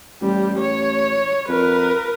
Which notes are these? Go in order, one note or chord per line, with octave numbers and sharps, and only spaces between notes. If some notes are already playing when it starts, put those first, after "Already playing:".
A1 G3
C#5
F2 A#4 B4